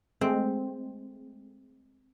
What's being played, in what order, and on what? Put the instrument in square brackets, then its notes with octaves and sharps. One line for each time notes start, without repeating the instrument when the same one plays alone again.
[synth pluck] G#3 A3 [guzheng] C4